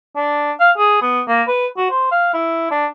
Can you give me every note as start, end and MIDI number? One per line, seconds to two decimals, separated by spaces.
0.16 0.52 62
0.60 0.71 77
0.78 0.98 68
1.02 1.22 59
1.28 1.43 58
1.48 1.67 71
1.77 1.90 66
1.90 2.09 72
2.12 2.32 77
2.34 2.67 64
2.71 2.86 62